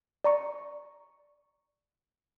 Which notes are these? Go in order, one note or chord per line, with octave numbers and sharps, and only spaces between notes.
D5 A#5 C#6